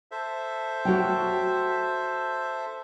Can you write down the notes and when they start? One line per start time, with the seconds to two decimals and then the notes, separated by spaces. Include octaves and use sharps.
0.11 A4 C5 E5
0.85 F#4 C#5 G5